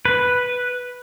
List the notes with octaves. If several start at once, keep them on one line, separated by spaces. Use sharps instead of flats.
B4